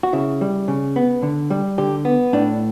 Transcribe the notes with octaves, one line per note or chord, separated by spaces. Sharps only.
F#4
C#3 E4
G3
C#3
B3
D3
G3
D3 G4
B3
A2 D4